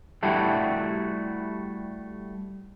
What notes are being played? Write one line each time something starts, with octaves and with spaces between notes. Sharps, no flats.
G3 A3 E4 F#4 G4 A4